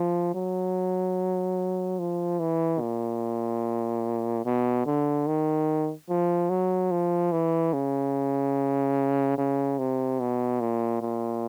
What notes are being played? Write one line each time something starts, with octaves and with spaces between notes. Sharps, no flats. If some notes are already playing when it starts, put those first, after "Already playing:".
Already playing: F3
F#3
F3
E3
A#2
B2
D3
D#3
F3
F#3
F3
E3
C#3
C#3
C3
B2
A#2
A#2